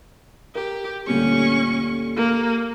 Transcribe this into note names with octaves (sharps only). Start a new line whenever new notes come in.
G4 A#4
D2 A#2 G3 C#4 C#6
A#3